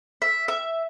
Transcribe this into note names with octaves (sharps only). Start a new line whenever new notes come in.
E5
E5